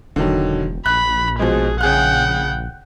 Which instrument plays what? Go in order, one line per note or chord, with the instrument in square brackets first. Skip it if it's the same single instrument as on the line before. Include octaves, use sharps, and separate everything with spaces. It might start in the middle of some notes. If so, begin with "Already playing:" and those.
[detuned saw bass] E1 [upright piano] D3 D#3 F#3
[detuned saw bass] A#1 [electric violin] B5 [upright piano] F#6
[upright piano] B2 F3 G#3 [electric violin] G#4
[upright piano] C#3 G#4 F#6 [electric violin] F#5 G5